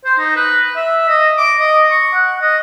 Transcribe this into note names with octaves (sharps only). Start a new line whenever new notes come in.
C5
D#4
B4
E5
D#5
D6
D#5
C#6
F#5
D#5